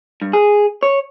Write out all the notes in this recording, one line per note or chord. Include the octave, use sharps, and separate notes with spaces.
G2
G#4
C#5